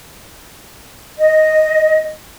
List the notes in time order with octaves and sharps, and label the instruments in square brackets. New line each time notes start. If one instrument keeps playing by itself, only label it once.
[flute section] D#5